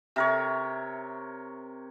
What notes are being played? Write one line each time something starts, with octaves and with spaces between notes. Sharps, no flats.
C3 A#4 C#5